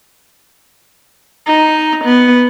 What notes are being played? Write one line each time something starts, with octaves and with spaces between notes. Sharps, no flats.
D#4
B3